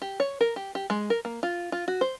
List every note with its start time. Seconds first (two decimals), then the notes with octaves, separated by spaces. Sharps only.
0.02 G4
0.20 C#5
0.41 A#4
0.56 G4
0.75 G4
0.90 G#3
1.10 A#4
1.25 A#3
1.43 F4
1.72 F4
1.88 F#4
2.01 C5